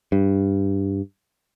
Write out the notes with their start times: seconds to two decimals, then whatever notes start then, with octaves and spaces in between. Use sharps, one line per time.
0.12 G2